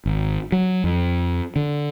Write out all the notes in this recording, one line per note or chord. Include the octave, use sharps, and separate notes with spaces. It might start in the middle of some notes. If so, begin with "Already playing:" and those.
G#1
F#3
F2
D3